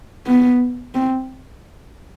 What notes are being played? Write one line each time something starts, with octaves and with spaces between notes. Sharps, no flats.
B3
C4